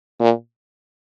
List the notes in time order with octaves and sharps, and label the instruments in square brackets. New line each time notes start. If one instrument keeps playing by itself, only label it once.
[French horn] A#2